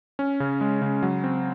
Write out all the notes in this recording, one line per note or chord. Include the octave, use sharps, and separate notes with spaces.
C#4
C#3
G#3
C#3
F#3
C4